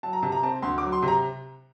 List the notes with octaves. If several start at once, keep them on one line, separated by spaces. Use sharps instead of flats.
F#3 A5
A#5
C3 A5
A#5
C4 A5
D2 C6
D6
F#3
C6
C3
A#5